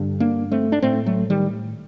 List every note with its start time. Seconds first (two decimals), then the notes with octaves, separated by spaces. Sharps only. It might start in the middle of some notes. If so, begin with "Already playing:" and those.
Already playing: G2 D3
0.20 A#3 D4
0.52 A3 C4
0.72 D4
0.82 A2 A3 C4
1.06 F#3 A3
1.30 D#3 G3